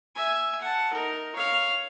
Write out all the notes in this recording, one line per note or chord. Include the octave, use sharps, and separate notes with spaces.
E5 G#5
F#5 A5
D#4 A#4
C#5 F5